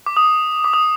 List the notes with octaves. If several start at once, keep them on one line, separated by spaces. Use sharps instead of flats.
D6
D#6
D6
D#6